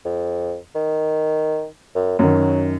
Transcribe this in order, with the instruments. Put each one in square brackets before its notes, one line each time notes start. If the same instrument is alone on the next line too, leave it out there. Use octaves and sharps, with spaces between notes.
[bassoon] F2
D#3
F#2
[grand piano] F#2 D#3 [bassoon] F#3